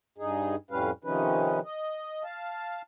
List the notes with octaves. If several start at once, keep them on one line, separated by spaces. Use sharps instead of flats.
G2 D#4 G#4
F2 A2 G3 C#4 B4 F5
C3 D#3 F3 C#4 D#4 B4
D#5
F5 A5